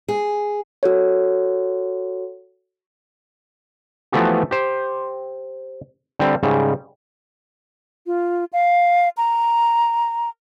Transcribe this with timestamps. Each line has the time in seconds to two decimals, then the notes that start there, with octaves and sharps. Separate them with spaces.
0.08 G#4
0.83 F#4 A4 C#5
4.12 E3 F3 A3 B3 F#4 G4
4.51 G4 C5
6.19 D3 G3 C4
6.43 G#2 C#3 G3
8.06 F4
8.53 F5
9.17 A#5